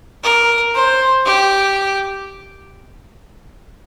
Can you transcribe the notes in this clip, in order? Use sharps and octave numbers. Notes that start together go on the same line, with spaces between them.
A#4
C5
G4